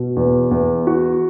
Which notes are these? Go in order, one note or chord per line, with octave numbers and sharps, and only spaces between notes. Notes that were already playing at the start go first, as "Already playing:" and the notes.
Already playing: B2
E2
E2
F#4